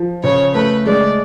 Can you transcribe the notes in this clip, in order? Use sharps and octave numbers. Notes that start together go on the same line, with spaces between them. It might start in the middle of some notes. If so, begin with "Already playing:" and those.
Already playing: F3
C#3 C#5
A3 B4
G#3 D5